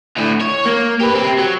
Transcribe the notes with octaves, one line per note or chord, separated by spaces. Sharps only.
D2 A2
C#5
A#3
G4 B4
C4 G4
F#3